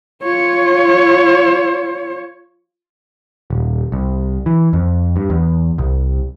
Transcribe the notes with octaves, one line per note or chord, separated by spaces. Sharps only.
F4 C#5
D#1
C2
E3
F2
G2
E2
C2